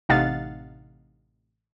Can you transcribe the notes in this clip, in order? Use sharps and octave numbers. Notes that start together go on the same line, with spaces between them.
A1 C3 D#4 F5 F#5 A6